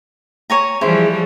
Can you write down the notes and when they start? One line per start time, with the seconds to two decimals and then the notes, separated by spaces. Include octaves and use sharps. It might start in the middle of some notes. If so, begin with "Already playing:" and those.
0.50 C#5 G#5 A#5
0.81 E3 F3 G3 E4 G#4 C5